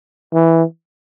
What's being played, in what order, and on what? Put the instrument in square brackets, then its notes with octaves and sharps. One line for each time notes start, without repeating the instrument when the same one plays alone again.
[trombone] E3